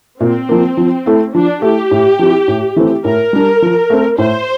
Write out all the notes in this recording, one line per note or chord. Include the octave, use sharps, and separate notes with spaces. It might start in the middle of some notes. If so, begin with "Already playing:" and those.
A#2 C4
F3 A#3
F3
A3 E4
F3 D4
A3 E4 G4
A2
F3 C4 E4
A2
E3 A3 C4 E4
A2 A#4
G3 D4
F3
A3 C4
A2 C5